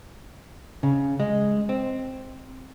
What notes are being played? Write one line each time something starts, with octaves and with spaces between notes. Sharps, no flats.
C#3
G#3
C4